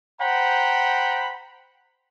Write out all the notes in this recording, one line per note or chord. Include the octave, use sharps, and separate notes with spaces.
C5 F#5 G5 A#5 B5